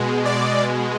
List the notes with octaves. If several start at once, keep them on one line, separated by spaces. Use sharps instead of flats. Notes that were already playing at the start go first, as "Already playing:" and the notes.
Already playing: B2 G#3
D5